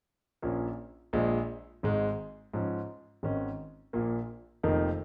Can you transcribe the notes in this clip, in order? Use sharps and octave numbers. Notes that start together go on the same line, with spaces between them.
A#1 A#2 A#3 C#4
A#1 A#2 G#3
G#1 G#2 G#3
G#2 F3 C#4
G#1 G#2 D#3 C#4
A#1 A#2 A#3
F1 F2 D#3 A#3 D#4